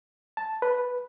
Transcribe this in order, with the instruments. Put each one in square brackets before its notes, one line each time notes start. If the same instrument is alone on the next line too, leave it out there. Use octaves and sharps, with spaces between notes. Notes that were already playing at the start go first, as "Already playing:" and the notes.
[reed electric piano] A5
B4